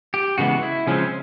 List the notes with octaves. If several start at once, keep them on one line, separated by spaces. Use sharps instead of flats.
G4
C#3 E3 G#3 B3 F#4
E4
C#3 F3 G#3 C4 C#4